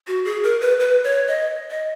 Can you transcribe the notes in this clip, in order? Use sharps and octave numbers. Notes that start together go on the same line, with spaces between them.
F#4
G#4
A#4
B4
B4
C#5
D#5
D#5